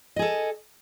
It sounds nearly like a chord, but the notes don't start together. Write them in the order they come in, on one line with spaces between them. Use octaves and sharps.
D#5 G#4 A4